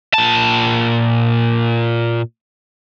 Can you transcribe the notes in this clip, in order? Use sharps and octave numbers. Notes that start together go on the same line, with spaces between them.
A#2 A5